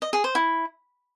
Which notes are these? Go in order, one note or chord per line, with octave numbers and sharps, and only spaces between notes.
D#5
G#4
C5
E4